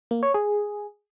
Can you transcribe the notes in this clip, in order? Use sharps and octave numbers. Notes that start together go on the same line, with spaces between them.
A#3
C#5
G#4